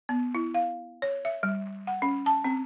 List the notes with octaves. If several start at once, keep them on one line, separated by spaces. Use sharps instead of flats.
B3
E4
F5
C#5
E5
G3
F#5
C#4
A5
C4